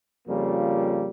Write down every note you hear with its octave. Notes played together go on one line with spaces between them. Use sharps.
F2 C#3 G3 A#3 F4